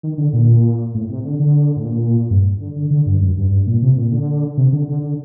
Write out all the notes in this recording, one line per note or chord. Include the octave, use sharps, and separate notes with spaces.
D#3
D3
A#2
A2
C3
D3
D3
A2
A#2
G2
D3
D3
D3
G2
F#2
G2
G2
A#2
C3
A#2
D3
C3
D3
D3
D3